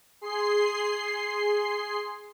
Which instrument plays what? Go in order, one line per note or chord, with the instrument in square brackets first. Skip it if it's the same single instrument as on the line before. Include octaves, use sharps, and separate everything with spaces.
[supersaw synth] G#4 C6 C7